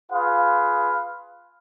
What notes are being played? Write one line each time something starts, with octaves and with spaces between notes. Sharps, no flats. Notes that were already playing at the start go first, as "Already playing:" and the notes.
F4 G#4 B4 F5